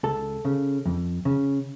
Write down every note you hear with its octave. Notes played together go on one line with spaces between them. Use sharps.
C#2 A4
C#3
F2
C#3